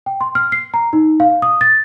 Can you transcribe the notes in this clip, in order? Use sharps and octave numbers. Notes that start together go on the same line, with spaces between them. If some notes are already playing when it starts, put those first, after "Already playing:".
G5
C6
F6
C7
A#5
D#4
F5
D#6
A6